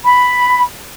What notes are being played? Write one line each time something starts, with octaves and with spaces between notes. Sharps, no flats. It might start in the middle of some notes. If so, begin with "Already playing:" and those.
B5